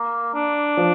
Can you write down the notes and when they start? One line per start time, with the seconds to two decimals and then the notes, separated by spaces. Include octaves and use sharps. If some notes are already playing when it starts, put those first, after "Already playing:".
Already playing: A#3
0.34 D4
0.77 F3